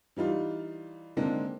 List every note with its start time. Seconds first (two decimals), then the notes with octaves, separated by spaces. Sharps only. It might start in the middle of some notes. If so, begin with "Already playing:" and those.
0.17 E3 G3 D#4 F4
1.17 D3 D#3 G#3 A#3 C4 D4